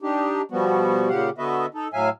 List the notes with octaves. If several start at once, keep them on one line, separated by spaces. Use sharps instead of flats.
D4 D#4 G4
B2 F3 G3 B3 F#4
A#2 C#3 G4 F5 F#5
D3 B3 F#4 B4 D#5 E5
D#4 A4
A2 F#3 E5 F5 G#5